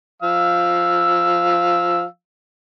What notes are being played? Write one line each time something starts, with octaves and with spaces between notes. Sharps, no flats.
F3 F5 E6